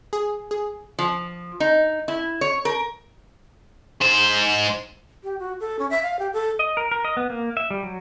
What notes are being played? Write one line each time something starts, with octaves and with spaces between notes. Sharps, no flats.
G#4
G#4
F3
D#4
E4
C#5
A#4
G#2 C5
G4
F#4
A4
C#4
E5
F5
G4
A4
D#5
A#4
A#4
D#5
B3
A#3
E5
G3
F#3